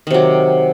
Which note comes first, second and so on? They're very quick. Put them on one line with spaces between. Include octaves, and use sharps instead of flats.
D#3 C3 F#3